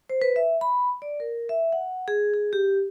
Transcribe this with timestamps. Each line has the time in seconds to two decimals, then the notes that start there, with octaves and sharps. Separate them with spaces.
0.10 C5
0.22 B4
0.36 E5
0.61 B5
1.02 D5
1.20 A#4
1.49 E5
1.72 F#5
2.08 G#4
2.34 G#4
2.53 G4